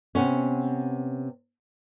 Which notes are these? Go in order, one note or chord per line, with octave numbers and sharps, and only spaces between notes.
C3 B3 C#4